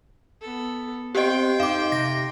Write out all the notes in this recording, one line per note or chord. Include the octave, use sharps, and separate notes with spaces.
B3 A4
C4 G4 D#5 G5 C6
F2 D#4 F5 D6
C3 A#6